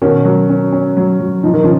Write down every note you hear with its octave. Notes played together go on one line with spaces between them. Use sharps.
B2 D#3 C#4
F#3
C#4
C#4
F#3
F#3
F3 D#4
D#3
C#3 F3